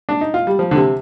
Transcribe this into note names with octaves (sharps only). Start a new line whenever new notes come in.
D4
D#4
F4
G3
F3
D3
C3